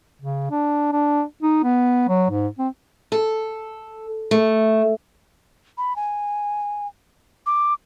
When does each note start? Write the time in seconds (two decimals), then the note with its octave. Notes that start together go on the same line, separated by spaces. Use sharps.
0.22 C#3
0.51 D4
0.92 D4
1.42 D#4
1.63 B3
2.08 F#3
2.30 G#2
2.59 C4
3.12 A4
4.31 A3
5.78 B5
5.96 G#5
7.46 D6